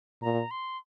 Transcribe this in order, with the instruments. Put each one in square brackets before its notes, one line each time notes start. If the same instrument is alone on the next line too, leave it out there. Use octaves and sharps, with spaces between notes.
[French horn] A#2 [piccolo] A#5
[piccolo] C6